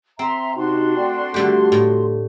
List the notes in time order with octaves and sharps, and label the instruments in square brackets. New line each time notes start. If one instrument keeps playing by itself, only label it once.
[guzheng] C4 [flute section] E5 A#5 C6
[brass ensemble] C3 D#4 [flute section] D4 F#4 C6
[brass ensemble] A3 D5 G5
[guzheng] D3 G3 G4 [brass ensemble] A3
[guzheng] A2